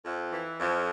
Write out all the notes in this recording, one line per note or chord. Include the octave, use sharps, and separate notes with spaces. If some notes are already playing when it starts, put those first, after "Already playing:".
F2
E3
F2